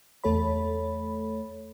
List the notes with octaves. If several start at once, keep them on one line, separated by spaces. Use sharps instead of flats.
E2 A3 A4 C#5 B5